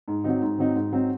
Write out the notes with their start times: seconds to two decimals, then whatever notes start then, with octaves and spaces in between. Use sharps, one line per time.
0.08 G#2
0.24 F#3 C4 D#4
0.42 G#2
0.59 F#3 C4 D#4
0.76 G#2
0.92 F#3 C4 D#4